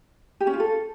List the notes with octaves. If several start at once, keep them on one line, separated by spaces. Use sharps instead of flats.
G4
C#4
F4
A4